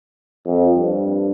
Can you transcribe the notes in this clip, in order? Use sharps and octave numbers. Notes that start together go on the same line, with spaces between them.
F2
G2